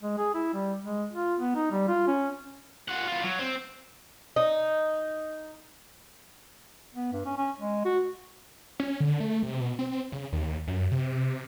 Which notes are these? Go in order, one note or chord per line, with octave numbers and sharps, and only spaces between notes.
G#3
G#4
E4
G3
G#3
F4
B3
D#4
G3
F4
C#4
F4 F#5
B3 F4
F#3
C4
D#4
B3
G2
C#4
C#4
G#3
F#4
C#4
D3
A3
C3
B2
C4
C#3
D#2
F#2
C3